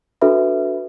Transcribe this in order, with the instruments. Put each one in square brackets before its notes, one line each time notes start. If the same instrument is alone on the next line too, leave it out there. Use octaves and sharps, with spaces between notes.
[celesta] D4 F#4 A4 B4 E5 B5